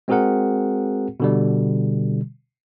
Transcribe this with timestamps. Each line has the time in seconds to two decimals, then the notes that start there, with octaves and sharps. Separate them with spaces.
0.08 G#3 C4 F#4 G#4 A#4 F#5
1.20 B2 D3 G3